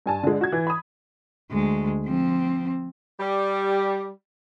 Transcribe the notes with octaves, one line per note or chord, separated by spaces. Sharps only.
G2 G#5 A5
D3 G#3
F#4 G#6
E3
B5 D#6
D2 G#3
F3 C4
G3